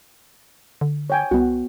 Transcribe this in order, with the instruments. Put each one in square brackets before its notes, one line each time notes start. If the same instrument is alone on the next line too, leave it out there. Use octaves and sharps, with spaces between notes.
[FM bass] D3
[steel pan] C#5 G5 G#5
[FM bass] C2 [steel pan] B3 F#4